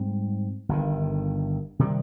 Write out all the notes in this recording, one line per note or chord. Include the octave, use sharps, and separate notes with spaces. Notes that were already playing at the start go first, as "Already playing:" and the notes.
Already playing: G#2 G3 C4
G1 G2 D#3
C3 D#3 G3